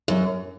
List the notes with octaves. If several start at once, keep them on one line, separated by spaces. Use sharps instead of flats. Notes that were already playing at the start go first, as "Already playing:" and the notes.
F#2